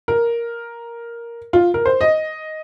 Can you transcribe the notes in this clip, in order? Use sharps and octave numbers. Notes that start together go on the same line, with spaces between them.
A#4
F4
A#4
C5
D#5